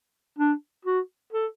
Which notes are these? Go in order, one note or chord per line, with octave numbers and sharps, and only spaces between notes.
D4
F#4
A4